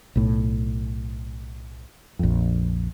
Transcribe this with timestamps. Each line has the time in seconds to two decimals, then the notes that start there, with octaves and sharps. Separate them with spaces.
0.16 B1 A2
2.19 A#1 F2